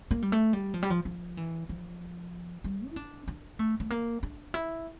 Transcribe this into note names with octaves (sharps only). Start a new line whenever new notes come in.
A#3
G3
A3
G3
F3
G3
F3
F3
E3
F3
G3
E4
D4
D4
A3
A3
A#3
D4
E4